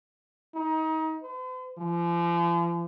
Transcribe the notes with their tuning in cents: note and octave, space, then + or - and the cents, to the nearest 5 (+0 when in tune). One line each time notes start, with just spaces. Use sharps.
D#4 +30
C5 -45
F3 -40